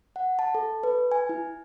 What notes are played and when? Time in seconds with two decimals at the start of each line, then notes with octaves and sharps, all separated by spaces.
0.16 F#5
0.39 A5
0.55 A4
0.83 B4
1.12 G#5
1.29 E4